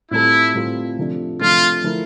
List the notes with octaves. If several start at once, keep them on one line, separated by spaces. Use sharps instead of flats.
A2 G3 C4 E4 F4 A4
A2 G3 C4 F4 A4
C3 F3 A3 D4
C3 F3 A3 D4 F4
F3 A3 E4 A#4